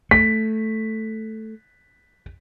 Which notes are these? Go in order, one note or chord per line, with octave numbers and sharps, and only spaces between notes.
A3 B6